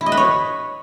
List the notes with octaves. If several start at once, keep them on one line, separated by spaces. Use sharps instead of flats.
E4
D#5
B4
C#5